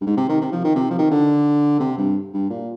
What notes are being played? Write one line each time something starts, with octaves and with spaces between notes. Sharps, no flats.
G2
G#2
C3
D#3
C3
F3
D#3
C3
F3
D#3
D3
C3
G2
G2
A#2